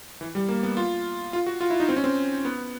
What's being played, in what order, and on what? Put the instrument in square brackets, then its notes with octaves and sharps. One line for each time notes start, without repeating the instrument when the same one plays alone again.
[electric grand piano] E3
G3
A#3
B3
F4
F4
F#4
F4
E4
D#4
C4
C#4
C4
B3